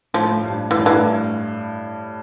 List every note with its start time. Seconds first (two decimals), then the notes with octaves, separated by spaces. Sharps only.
0.14 A2 F3
0.31 A2
0.43 G2
0.71 G2 E3
0.79 A2
0.86 G2 E3